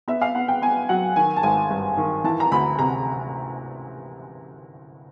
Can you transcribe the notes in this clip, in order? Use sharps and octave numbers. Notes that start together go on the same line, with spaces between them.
B3 E5
F5
B3 F#5
G5
B3 G#5
F#3 F#5
D#3 G#5
A5
G#1 G#5
G2
D#3
E3 A5
A#5
D2 B5
C3 A#5